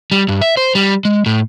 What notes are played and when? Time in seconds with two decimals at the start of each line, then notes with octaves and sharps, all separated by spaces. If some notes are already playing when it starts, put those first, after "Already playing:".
0.12 G3
0.28 G2
0.41 E5
0.57 C5
0.75 G3
1.05 G#3
1.26 A2